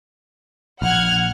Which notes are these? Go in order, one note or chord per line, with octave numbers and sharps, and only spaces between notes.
A#1 F#5 F6 G#6